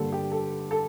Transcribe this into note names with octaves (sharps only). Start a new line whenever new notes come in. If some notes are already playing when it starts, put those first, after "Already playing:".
Already playing: G2 D3 G3 A#3 A4
G4
A4
A4